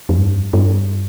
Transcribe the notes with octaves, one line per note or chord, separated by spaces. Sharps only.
F2
G2
G2